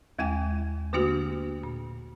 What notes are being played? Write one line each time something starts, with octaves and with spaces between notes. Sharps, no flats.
D#2 G#3 E4 G5 G#5
D3 A3 A#3 D4 F#4 G4
A#2